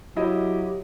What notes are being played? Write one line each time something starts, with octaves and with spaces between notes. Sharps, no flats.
F#3 E4 G4 D#5